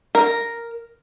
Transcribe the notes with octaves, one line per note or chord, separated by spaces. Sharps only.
A#4